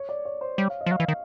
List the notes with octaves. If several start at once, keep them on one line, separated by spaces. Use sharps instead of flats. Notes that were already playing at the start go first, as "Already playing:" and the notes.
Already playing: C#5
D5
C#5
C5
G3 C#5
F5
D#5
F3
F#3 F5
E3
D#3